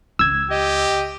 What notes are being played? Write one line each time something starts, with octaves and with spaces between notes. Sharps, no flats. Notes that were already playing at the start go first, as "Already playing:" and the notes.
C#2 E6 G#6
G4 D#5